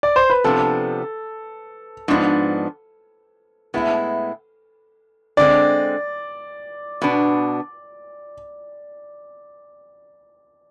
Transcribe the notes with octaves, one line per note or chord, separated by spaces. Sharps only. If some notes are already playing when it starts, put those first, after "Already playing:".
D5
C5
B4
C3 F3 B3 D4 A4
G#2 F3 B3 D4
A2 G#3 B3 E4
D3 G#3 C4 D5
B2 B3 D4